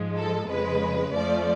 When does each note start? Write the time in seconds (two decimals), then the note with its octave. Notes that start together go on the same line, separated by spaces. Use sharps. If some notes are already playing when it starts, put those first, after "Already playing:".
Already playing: G#2 F3 G#3
0.17 A4
0.49 F2 C#3 G#3 B4
1.14 F2 F3 A3 D5